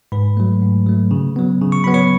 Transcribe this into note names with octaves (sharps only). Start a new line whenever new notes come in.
G#2 B4 B5
F#3 A3
G#2
F#3 A3
C#3
F#3 B3
C#3
C#6
F#3 B3 B5
C#5 C#6